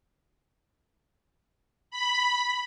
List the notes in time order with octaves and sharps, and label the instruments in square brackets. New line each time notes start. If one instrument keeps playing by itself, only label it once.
[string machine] B5